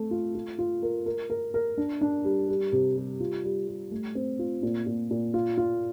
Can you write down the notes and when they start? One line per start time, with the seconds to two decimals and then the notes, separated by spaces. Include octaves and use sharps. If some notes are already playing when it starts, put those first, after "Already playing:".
Already playing: A3 C4 A4
0.11 F4
0.35 F4
0.59 F4
0.83 A#4
1.06 A#4
1.30 A#4
1.54 A#4
1.78 D4
2.01 D4
2.25 G3
2.49 G3
2.72 C3
2.96 G3
3.20 F4
3.44 G3
3.68 G3
3.91 A3
4.15 C4
4.39 F4
4.63 A#2
4.86 A#2
5.11 A#2
5.34 F4
5.58 F4